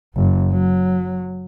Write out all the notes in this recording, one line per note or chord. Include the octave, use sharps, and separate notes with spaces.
F#1
F#3